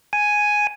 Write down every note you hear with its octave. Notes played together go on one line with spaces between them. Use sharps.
G#5